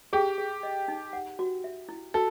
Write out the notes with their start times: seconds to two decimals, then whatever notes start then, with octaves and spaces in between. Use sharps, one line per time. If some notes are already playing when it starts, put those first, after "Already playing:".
0.13 G4 G#4
0.38 G#4
0.63 D#5
0.88 D#4
1.13 F#5
1.39 F#4
1.64 E5
1.89 E4
2.14 F#4 A4